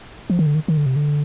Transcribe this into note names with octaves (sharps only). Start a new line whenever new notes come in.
F3
D#3
D3
D#3
D#3
D3
C3
D3